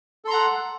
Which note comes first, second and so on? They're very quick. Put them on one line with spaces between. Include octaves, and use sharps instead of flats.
A4 C6 A#5 F#5